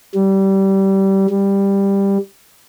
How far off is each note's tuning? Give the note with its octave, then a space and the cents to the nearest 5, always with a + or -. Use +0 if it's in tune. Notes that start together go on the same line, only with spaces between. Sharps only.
G3 -20
G3 +10